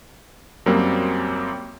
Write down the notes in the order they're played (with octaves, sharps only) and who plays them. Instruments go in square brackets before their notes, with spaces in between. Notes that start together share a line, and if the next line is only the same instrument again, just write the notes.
[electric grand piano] F#2 F#3 G3 A#3 C4